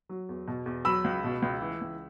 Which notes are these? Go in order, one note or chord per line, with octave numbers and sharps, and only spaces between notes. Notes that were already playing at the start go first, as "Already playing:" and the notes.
F#3
E2
B2
E2
F#3 B5 E6
C#2
B2
C#2
E3
C#2